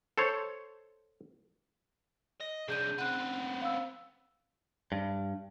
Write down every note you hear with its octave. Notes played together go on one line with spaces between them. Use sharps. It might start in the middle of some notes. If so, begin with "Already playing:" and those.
A4 C5 C#5
D#5
C3 D4 G#4 G6 D#7
B3 C4 F#6 D#7
F5 E6
G2